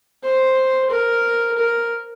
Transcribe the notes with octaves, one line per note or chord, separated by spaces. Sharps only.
C5
A#4
A#4